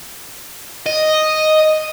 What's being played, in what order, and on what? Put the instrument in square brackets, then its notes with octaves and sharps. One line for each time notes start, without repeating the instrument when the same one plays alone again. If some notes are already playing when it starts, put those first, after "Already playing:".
[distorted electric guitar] D#5